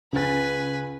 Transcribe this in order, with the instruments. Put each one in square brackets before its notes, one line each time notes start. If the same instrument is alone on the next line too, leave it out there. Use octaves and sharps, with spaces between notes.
[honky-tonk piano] C#2 A6 [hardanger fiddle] B4 G#5